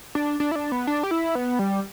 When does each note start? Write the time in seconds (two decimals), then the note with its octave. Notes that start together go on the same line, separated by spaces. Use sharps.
0.15 D4
0.40 D4
0.51 E4
0.56 D4
0.72 B3
0.87 D4
1.03 G4
1.11 E4
1.35 B3
1.59 G3